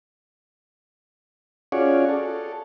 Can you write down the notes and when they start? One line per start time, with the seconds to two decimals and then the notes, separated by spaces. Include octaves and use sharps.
1.72 C#4 F4 F#4 G#4 C#5 D5
2.09 A4